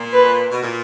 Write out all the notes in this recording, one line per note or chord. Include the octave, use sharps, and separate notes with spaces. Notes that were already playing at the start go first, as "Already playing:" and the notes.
Already playing: A#2
B4
B2
A#2